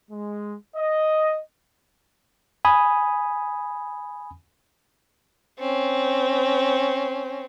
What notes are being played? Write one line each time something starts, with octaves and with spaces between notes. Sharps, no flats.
G#3
D#5
G#5 B5 D#6
C4 C#4